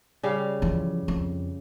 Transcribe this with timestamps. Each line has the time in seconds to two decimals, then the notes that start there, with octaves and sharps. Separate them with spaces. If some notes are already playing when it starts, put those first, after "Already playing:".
0.23 C#3 G3 F5
0.62 E2 F3
1.08 F2